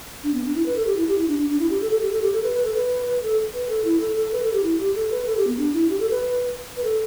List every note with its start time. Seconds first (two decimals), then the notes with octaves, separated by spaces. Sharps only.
0.24 D4
0.34 B3
0.45 D4
0.55 E4
0.66 B4
0.76 A4
0.87 G4
0.97 E4
1.07 G4
1.18 E4
1.28 D4
1.38 D4
1.49 D4
1.60 E4
1.70 G4
1.81 A4
1.91 A4
2.02 G4
2.12 A4
2.22 G4
2.33 A4
2.43 B4
2.54 B4
2.65 A4
2.75 B4
3.06 B4
3.23 A4
3.54 B4
3.69 A4
3.85 E4
4.00 A4
4.17 A4
4.33 B4
4.43 A4
4.53 G4
4.64 E4
4.79 G4
4.95 A4
5.11 B4
5.27 A4
5.37 G4
5.47 B3
5.58 D4
5.74 E4
5.90 G4
6.00 A4
6.11 B4
6.77 B4
6.84 A4